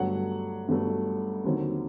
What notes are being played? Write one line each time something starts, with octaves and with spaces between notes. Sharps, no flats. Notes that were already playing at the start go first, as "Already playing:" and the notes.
Already playing: G1 G2 F#3 A3 F#5
G1 G2 F#3 A3
D#2 D3 F#3 C4